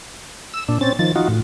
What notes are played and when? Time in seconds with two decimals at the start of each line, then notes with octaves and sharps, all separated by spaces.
0.54 E6
0.68 A#2 D4
0.81 C4 C#4 A6
0.99 D#3 F3 A6
1.16 D#4 F4 F#4
1.28 A2